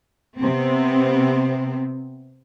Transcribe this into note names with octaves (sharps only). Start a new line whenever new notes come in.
C3 B3 C4